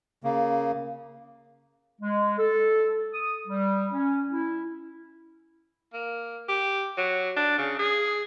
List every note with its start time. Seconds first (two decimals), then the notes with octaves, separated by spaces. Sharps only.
0.24 C#3 A#3
2.01 G#3
2.38 A4
3.13 D#6
3.48 G3
3.92 C#4
4.32 E4
5.93 A#3
6.48 G4
6.97 F#3
7.36 D4
7.58 C#3
7.79 G#4